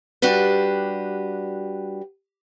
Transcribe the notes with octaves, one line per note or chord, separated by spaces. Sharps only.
G3 D4 F#4 G4 B4